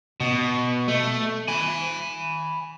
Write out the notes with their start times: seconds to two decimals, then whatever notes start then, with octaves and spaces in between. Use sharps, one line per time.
0.20 B2
0.88 A3
1.48 G#5 B5